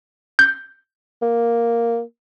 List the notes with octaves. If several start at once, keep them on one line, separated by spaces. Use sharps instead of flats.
G6
A#3